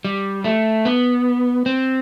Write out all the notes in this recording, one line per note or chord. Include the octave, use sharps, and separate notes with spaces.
G3
A3
B3
C4